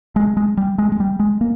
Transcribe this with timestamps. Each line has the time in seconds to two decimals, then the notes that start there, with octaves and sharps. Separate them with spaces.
0.16 G#3
0.37 G#3
0.57 G3
0.78 G#3
0.92 G#3
1.00 G3
1.20 G#3
1.41 A#3